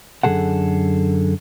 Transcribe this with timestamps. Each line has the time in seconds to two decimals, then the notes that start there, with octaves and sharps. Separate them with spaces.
0.23 F#2 D3 D#3 G#4 A4 F#5